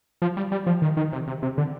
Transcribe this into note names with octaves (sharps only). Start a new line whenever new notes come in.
F3
G3
G3
F3
D#3
D#3
C3
C3
C3
D3